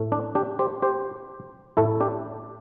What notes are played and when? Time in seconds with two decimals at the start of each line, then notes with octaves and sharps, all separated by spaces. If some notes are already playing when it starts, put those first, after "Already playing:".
Already playing: A2 A3
0.12 D4
0.35 D4 G4
0.59 G4 C5
0.82 G4 C5
1.77 A2 A3 E4 A4
2.00 D4 G4